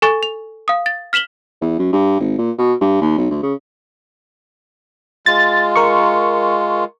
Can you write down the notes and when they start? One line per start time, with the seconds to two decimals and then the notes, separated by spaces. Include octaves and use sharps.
0.02 A4 G#5 C#6 A6
0.23 F7
0.68 F5 D#6
0.86 A6
1.13 F6 B6 E7 F#7 G7
1.61 E2
1.79 F#2
1.93 G2
2.20 G#1
2.38 A#2
2.58 B2
2.81 G2
3.01 D#2
3.18 B1
3.31 D2
3.43 C#3
5.26 G#3 F4 A6
5.76 A#4 C#6